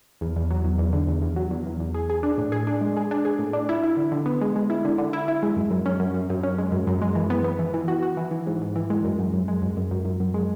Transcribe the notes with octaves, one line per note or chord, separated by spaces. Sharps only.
E2
E2
F#3
E2
E2
D3
E2
E2
F#3
E2
E2
E2
G#4
G#4
D4
A2
G#4
D4
G#3
G#4
D4
G#4
A2
D4
E4
E4
D3
D3
B3
G#3
G#3
E4
D3
D3
E4
E4
G#3
F#2
F#2
C#4
F#2
F#2
F#2
C#4
G#3
F#2
F#2
G#3
E3
B3
B3
E3
E3
F#4
F#4
E3
E3
G#2
G#2
E3
G#3
F#2
F#2
F#2
G#3
F#2
F#2
F#2
F#2
F#2
G#3